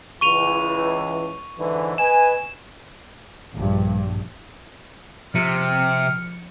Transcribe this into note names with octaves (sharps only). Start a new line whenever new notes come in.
C#2 E3 C#6 D#7 F7
G#2 D3 E3
B4 D#5 G#5 E7
A#1 G2
C3 F3 F6 C#7